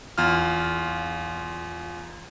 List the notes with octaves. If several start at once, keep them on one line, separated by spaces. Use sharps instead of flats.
E2 F4 F6